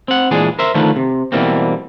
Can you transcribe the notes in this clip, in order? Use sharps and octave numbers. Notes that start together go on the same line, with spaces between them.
C4 F#5
A#2 E3 G#3 D4 G#4
A#4 C5 E5
D3 D#3 F3 A3 B4
C3
B2 E3 G3 A#3 C4